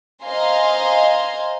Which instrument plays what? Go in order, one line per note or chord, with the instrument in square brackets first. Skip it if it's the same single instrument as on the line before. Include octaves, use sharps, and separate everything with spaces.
[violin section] C5 D#5 F5 G#5 A#5 C6